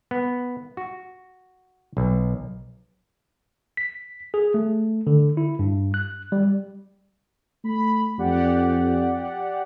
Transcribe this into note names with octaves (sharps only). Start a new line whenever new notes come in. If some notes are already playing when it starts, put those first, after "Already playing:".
B3
F#4
B1
B6
G#4
A3
D3
E4
G2
F#6
G3
A3 B5
F2 G4 D5 F#5